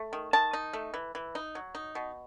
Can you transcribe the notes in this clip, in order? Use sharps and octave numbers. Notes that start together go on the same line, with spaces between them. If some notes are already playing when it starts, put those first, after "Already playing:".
Already playing: A3
D#3
D#3 A5
D#4
A3
E3
E3
D#4
F#3
D#4
B2